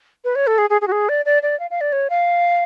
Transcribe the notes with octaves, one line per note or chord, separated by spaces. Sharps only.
B4
C#5
A4
G#4
G#4
G#4
F#4
G#4
D5
D5
D5
F5
F5
D5
C#5
F5